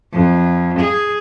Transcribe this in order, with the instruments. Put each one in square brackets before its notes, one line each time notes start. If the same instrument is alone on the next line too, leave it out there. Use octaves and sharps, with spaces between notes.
[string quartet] F2
G#4